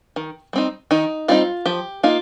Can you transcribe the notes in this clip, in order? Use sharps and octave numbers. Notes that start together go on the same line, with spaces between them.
D#3
G3 C4 D#4
D#3 D#4
G3 C4 D#4 F4
F3 G4
A#3 D#4 F4